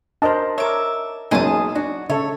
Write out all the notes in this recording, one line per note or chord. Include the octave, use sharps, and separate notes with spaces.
D4 A#4 C5 D#5 A5
A#4 C#5 E5 D6
F#1 B1 F#2 D#4 G#4 A5 D#6
D4 F#4
C#3 A4 C#5 E5